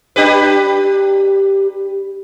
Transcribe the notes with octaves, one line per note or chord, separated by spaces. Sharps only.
D4 G4 B4